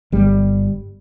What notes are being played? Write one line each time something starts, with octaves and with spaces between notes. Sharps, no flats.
G1 G3